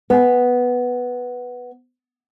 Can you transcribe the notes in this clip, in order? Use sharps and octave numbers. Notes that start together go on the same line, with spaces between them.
B3 G#5